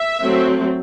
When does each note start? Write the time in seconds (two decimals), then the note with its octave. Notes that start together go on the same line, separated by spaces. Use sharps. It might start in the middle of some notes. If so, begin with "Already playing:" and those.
Already playing: E5
0.23 F#3 A3 C4